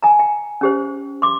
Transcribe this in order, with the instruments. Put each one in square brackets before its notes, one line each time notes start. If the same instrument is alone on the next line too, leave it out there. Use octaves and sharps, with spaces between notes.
[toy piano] G#5 A#5
G5
C#4 G4 C5
C6 D6